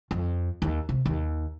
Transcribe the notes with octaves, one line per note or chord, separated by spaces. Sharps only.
F2
D#2
C3
D#2